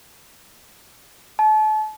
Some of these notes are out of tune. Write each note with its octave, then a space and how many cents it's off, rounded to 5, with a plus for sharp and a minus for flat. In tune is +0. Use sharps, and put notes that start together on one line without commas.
A5 -35